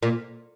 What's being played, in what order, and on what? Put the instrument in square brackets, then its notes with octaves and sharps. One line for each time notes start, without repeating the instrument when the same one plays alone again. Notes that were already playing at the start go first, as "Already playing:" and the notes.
[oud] A#2